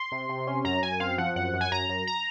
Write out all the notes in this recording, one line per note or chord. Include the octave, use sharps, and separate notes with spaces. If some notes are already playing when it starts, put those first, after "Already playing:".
Already playing: C6
C3
C3
C#4
F#2 A#5
F#2 G#5
C4 F5
F3 F#5
F#2 F#5
F#2
G#5
F#2 A#5
F#2
A#5